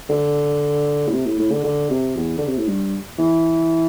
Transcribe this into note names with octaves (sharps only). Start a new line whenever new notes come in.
D3
A2
C3
A2
A2
D3
D3
C3
E2
D3
C3
A2
G2
E3